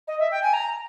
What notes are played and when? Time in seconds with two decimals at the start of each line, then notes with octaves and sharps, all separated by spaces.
0.07 D#5
0.19 E5
0.31 G5
0.42 G#5
0.53 A#5